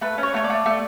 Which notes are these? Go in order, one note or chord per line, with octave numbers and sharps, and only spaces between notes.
A3 B4
C#4
C#5
A3 C#5
D5
A3
A3